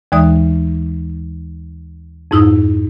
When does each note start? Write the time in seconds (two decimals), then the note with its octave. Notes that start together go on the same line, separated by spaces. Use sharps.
0.12 D#2 E3 G#3 D5 D#6
2.31 F2 G#2 D#4 E4 D#6